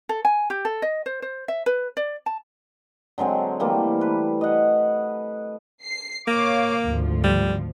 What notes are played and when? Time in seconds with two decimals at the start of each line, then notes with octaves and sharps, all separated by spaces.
0.09 A4
0.25 G#5
0.50 G4
0.65 A4
0.82 D#5
1.06 C5
1.22 C5
1.48 E5
1.66 B4
1.97 D5
2.26 A5
3.18 D3 F#3 G#3 C4
3.60 E3 G3 A3 A#3
4.01 B4
4.41 D#5 F#5
5.83 C7
6.28 A#3 C#5 F5 D6
6.83 G#1 D2 F3
7.24 G3